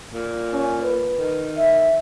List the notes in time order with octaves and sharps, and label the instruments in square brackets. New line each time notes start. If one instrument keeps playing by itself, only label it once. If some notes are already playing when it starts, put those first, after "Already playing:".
[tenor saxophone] A#2
[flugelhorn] C#4
B4
[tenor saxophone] D#3
[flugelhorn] E5